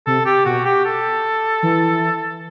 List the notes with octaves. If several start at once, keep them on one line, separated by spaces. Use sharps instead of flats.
C3 A4
G4
B2 F#4
G4
A4
E3